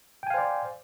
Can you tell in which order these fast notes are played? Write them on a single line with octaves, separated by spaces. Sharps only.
G5 G#5 F5 C5 D5